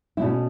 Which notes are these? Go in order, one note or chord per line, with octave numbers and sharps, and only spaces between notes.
E4
B2 A3 C#4 D4